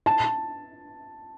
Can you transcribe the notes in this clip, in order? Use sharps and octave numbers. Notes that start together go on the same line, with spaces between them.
A5